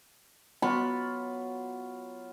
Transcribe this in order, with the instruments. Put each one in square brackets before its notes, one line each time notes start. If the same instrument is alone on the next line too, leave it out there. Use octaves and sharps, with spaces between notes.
[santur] F#3 F4 [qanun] B3 [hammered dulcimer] B5